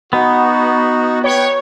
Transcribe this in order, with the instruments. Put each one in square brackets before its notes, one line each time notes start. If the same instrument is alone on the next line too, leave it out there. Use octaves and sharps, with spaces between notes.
[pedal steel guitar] B3 [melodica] D#4 [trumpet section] F#4
[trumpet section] B4 G5 [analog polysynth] C#5